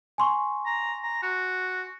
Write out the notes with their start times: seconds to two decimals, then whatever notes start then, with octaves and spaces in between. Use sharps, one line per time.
0.18 G#5 C6 C#6
0.66 A#5
1.03 A#5
1.22 F#4